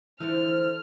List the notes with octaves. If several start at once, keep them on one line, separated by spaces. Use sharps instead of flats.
D3 E3 F3 A3 F6